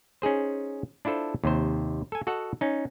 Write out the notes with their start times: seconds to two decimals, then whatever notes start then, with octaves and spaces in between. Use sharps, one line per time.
0.22 C#4 D#4 G#4 C5
1.05 D4 E4 F4 A4 C5
1.44 D#2 C3 C5
2.12 A4 G#5
2.27 F#4 A4 D#5 F#5
2.61 C#4 D#4